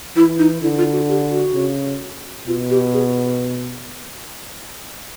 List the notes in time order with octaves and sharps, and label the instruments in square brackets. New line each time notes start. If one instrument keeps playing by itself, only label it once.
[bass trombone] E3 [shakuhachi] E4
[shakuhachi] D#4
[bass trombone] D3 [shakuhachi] E4
[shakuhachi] F4
F#4
G4
F#4
[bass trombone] C#3
[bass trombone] B2 [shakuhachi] F4
[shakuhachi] G4
G#4